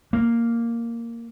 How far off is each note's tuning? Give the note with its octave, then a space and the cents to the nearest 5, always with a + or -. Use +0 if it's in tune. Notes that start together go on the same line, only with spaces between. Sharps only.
A#3 -5